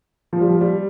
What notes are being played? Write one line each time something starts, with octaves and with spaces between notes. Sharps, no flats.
F3
G3
F3
G3